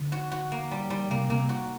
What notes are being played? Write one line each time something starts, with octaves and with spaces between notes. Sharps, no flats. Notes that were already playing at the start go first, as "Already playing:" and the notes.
Already playing: D3
F#4
F#4
A#3
G3
G3
C3 A#3
C3 A#3
F#4